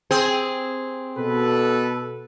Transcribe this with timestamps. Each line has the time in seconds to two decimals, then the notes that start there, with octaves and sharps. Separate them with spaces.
0.11 C4 G#4 C5
1.18 B2 A4 B4